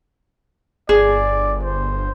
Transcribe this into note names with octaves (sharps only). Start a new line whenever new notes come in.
G1 G#4 D5
C5